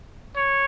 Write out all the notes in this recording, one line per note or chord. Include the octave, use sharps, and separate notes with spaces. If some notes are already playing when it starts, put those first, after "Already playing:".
C#5